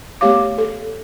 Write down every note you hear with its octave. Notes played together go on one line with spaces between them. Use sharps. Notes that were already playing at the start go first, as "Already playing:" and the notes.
A3 B3 G4 C#5 F5 D6
A4